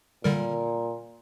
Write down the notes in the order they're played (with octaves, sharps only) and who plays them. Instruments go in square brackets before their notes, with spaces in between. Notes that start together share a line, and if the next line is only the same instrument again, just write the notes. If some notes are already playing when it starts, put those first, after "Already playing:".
[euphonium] A#2 [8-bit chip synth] D3 G3 A#4